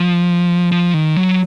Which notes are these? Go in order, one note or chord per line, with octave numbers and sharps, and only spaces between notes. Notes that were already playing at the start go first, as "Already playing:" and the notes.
Already playing: F3
F3
D#3
F#3